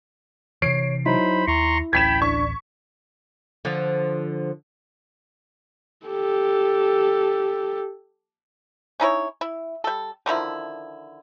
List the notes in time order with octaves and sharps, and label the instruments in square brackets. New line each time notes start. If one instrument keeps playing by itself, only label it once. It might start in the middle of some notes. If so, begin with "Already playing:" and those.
[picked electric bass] C3 E3 [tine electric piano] C#5 [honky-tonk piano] C7 D7
[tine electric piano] F#3 D#4 E4 [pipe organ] C5 B5
[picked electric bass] D#2 [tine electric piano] E4 [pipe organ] A#5 C6 C#6
[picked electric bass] D1 A1 C#4 [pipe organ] G5 B5 [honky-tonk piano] G#6 B6 E7
[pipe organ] D4 [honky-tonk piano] C#6
[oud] D3 F3
[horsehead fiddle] G4 A4
[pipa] C#4 D#4 E4 C#5
E4
G3 A4
D3 D#3 F3 E4